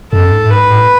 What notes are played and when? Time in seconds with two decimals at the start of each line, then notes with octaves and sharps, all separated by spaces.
0.12 F#2 A4
0.32 G#2
0.44 A2
0.50 G#2 B4
0.70 A2